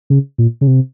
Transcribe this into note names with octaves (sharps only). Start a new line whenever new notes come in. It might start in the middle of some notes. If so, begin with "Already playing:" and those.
C#3
A#2
C#3
C3